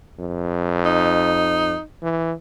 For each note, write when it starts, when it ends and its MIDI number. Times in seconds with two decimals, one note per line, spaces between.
0.19 1.75 41
0.85 1.81 63
2.03 2.33 52